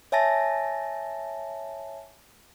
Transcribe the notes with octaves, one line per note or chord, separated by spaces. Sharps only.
C#5 E5 G#5 A5 A6 A#6